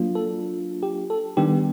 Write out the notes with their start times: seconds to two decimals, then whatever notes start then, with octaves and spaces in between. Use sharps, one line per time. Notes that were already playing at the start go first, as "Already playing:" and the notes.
Already playing: F#3 A#3 D4 F4
0.15 A4
0.83 G4
1.10 A4
1.37 D#3 G3 B3 D4 G4